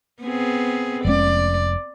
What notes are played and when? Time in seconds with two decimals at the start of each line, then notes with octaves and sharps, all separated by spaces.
0.23 B3 C4 G#4
1.05 F1 G#3 C#4 D5